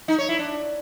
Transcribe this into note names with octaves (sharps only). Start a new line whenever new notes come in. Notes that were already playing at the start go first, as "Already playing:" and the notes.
D#4
C#5
E4
D4